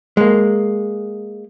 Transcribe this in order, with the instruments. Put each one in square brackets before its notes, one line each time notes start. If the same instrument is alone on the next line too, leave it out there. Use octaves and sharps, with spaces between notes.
[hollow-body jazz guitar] G#3 A#3